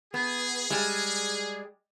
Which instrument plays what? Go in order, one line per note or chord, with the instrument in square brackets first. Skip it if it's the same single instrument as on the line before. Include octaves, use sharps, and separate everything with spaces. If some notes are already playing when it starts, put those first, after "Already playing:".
[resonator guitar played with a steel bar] B3 [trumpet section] G#4
[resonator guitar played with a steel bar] G3 G#3